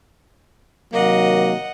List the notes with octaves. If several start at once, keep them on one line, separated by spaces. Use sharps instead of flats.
C3 D#3 F#3 A#3 D#5 F#5